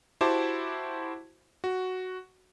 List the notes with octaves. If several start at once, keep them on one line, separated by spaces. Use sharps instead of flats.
E4 F#4 G4 C5 A5 D6
F#4